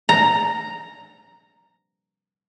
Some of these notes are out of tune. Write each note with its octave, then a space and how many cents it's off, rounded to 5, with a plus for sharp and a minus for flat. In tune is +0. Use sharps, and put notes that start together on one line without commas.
A#5 -5